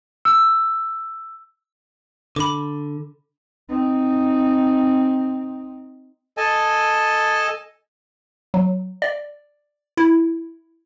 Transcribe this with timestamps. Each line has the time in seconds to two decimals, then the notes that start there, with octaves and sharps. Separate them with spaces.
0.25 E6
2.36 D3 B5 D6
3.69 C4 D#4
6.37 A4 D#5 G#5 A5
8.54 F#3
9.02 D5
9.97 E4